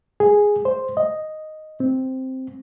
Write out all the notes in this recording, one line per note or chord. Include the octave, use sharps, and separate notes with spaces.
G#4
C5
D#5
C4